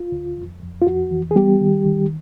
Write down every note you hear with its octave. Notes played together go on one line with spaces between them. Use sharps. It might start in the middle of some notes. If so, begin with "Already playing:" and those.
Already playing: F4
D2
F2
F2
F4
F2 F#4
E3
G#4
G3 B3 G4
D#3
D#3